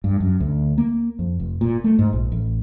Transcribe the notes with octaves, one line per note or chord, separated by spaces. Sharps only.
G2
F#2
D2
A#3
F2
F1
A#2
A3
G#2
A#1
A1